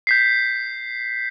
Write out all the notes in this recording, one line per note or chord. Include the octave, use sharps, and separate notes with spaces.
G6 B6 C7